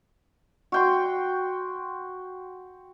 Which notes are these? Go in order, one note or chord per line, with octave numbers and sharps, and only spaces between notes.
F#4 G5 C6